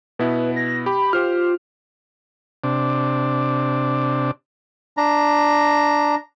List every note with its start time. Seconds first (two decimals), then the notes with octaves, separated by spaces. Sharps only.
0.19 B2 B3 E4 B4
0.56 A#6
0.86 G4 B5
1.13 F4 G4 C5 F6
2.64 C3 D4
4.97 D4 A#5